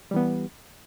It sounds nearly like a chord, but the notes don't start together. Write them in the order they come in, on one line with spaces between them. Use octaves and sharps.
G3 E3 B3